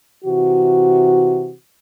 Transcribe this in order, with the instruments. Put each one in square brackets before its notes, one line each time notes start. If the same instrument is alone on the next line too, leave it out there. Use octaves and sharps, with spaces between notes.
[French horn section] C3 E3 F#4